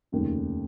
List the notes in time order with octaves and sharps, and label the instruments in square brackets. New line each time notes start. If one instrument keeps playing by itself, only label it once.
[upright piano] F1 D#2 C#3